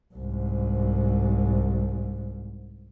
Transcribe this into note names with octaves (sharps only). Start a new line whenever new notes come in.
C2 G#2